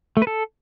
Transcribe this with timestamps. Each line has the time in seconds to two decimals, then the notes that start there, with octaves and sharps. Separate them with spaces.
0.17 A3
0.22 B4
0.27 A4